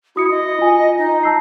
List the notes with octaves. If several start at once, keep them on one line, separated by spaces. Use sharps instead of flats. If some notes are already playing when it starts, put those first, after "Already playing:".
E4 F#4 D#6 C#7
D#5
F4 G#5
D#4
A5 E6 C7